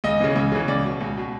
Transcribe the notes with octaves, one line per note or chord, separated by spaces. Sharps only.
C#2 D#5
C#3 E3
C#2
C#3 E3
C#2 D5
B2
C#2
B2